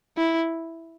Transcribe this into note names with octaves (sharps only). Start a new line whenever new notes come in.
E4